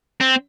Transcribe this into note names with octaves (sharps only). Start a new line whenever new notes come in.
C4